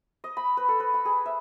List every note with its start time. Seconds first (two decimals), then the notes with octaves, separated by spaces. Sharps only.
0.24 D#5
0.37 B5
0.57 B4
0.68 A4
0.80 B4
0.94 B5
1.05 G#4
1.26 E5